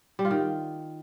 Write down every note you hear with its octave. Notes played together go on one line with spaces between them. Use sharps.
G3
F4
D#3